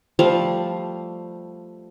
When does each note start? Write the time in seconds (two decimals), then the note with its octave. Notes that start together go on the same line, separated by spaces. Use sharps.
0.19 F3 G3 A3 F5